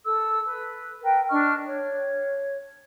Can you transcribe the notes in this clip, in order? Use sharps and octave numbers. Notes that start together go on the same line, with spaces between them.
A4 E6
B4
A#4 B4 G5
D4 D#5 C#6 F6
C#5